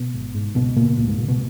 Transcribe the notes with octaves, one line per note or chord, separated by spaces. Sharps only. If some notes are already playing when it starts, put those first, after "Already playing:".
Already playing: B2 B3
G#1
G#2
C#2 B2 B3
A#2 C#3 A#3
C#2 A#2 A#3
G#2 G#3
A#2 C#3 A#3
B2 B3